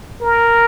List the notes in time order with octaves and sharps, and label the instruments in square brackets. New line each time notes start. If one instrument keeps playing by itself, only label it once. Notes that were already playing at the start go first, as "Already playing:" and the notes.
[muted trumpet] A#4